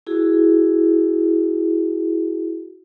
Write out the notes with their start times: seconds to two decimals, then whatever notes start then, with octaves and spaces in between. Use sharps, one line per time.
0.07 E4 F#4 G#4